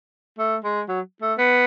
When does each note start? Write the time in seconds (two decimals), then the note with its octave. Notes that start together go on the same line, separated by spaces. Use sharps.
0.39 A3
0.64 G#3
0.88 F#3
1.22 A3
1.38 B3